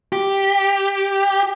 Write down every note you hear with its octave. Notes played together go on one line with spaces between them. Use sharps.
G4